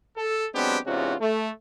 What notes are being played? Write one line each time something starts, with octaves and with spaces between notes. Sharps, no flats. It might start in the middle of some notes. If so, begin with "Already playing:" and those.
A4
F#3 G#3 B3 C4 D4 G4
E2 G#2 C3 C#4 F4 F#4
A3